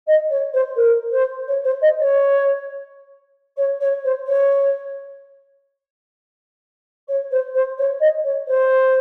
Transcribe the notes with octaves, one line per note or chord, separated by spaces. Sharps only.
D#5
C#5
C5
A#4
C5
C#5
C5
D#5
C#5
C#5
C#5
C5
C#5
C#5
C5
C5
C#5
D#5
C#5
C5